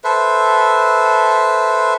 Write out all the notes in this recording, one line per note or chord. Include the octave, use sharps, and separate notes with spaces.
A4 B4 C5 E5